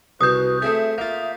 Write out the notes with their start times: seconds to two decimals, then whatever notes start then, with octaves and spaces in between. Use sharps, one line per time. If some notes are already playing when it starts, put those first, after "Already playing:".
0.21 C2 F#4 B4 D#6 G6
0.62 A3 C4 G#4 E5
0.98 A#3 F4 E5